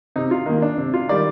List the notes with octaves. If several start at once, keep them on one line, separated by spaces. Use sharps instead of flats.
C3 D#4
F4
D#3 A#3
D4
C3
F4
D#3 G3 D5